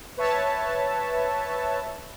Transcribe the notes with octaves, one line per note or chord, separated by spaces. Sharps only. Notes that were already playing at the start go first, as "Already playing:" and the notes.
B4 C#5 E5 A5